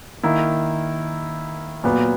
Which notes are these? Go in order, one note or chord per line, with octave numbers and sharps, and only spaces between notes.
D#3 A#3 E4
A#2 F#3 B3